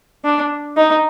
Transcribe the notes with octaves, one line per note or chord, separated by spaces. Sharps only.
D4
D#4